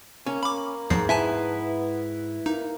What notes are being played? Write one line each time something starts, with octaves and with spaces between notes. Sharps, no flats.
A#3 C#4
A#3 B5 D6
E2 G#2 F3 C7
B3 E4 B4 E5 G#5 A5
A#3 D#4